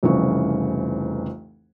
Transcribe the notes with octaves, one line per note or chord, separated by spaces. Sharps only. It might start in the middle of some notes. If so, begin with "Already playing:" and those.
F1 C2 F2 C#3 E3 C#6